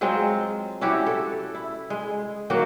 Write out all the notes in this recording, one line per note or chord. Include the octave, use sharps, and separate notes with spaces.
F#3 G#3 C4 F4
C#4 E4 F#4 G4
A4
E4
G#3
D#3 F#3 A#3 F#4